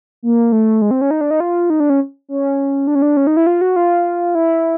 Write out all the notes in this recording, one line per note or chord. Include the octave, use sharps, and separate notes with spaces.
A#3
A3
G#3
C4
C#4
D#4
D4
D#4
F4
D#4
D4
C#4
C#4
D4
C#4
D4
C#4
D#4
E4
F4
F#4
F4
E4